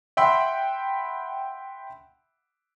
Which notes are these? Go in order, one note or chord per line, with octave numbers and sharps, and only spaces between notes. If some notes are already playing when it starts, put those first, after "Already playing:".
E5 F#5 G5 B5 C6 E6